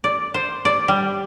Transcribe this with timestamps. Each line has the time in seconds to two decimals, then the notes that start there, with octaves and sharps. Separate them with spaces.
0.04 D5
0.34 C5
0.65 D5
0.88 G3